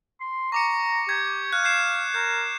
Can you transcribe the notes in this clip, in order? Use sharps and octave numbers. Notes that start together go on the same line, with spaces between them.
C6
A#5 C#6 D6 C#7
G4 G#6
F5 F#6
G6 C7 E7
A#4 G6